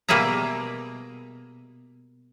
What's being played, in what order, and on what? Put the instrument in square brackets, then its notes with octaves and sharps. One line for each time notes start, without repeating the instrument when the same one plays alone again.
[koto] B2 G3 A#3 G#4 E5 A#5